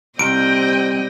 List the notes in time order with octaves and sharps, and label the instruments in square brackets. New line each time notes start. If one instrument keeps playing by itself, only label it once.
[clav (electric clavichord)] C2 [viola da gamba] G3 D#5 [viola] C4 G5 [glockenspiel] D7